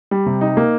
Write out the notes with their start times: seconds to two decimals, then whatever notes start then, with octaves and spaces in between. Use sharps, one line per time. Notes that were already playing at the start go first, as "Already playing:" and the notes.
0.11 G3
0.26 C3
0.41 D#4
0.57 A#3